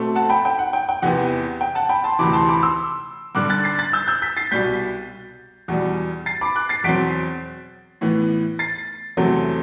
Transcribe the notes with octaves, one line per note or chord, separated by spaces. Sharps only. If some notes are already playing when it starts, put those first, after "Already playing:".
Already playing: B2 A3 C4
F#5 A5
G5 B5
G5
F#5
G5
G5
E2 C3 E3 B3 F#5
G5
F#5 A5
G5 B5
A5 C6
D2 C3 E3 B5 D6
A5 C6
B5 D6
C6 E6
G2 D3 G3 D6 F#6
F#6 A6
A6 C7
F#6 A6
E6 G6
E6 G6
G6 B6
A6 C7
C2 B2 G3 G6 B6
E2 B2 G3
A6 C7
B5 D6
D6 F#6
A6 C7
E2 B2 F#3 C4 B6 D7
A2 E3 B3
A6 C7
E2 C3 F#3 A3 C4